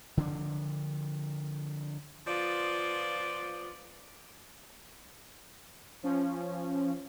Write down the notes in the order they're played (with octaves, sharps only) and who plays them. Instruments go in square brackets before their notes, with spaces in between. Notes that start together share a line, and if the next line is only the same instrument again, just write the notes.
[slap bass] D3 F3 D4
[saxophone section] F3 B3 F4 D5
[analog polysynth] F3 C#4